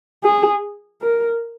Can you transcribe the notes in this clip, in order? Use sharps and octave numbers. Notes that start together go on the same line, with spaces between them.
G#4
A#4